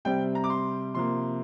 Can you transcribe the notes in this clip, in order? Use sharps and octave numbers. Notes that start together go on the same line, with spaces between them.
C3 G3 C4 G5
A#5
D6
C6
C3 F3 A#3 C6